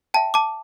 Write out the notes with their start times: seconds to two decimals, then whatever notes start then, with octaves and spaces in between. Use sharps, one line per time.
0.14 E5 G5 A5
0.34 A5 D6